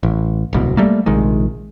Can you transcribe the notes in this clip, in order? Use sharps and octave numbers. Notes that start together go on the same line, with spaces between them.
A1
D1 C2 B2
G3 A3 A#3
A#1 C3 D#3 G#3